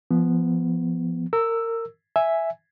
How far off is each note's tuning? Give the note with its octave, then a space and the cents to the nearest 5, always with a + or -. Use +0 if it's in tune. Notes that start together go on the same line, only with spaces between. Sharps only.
F3 -25 B3 +0
A#4 -25 E6 +5
E5 +0 G#5 +0